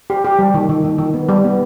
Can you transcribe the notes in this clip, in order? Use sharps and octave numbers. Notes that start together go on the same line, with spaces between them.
G4
G4
G3
D#3
D#3
D#3
D#3
B3
G3
B3